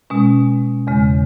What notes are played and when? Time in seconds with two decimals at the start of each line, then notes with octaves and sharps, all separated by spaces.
0.10 B2 G#3 C#4
0.87 E2 C#3 G#3